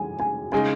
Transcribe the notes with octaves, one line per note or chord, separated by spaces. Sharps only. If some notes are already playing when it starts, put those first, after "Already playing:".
Already playing: G#5
G#5
C#3 G#3 D#4 G#5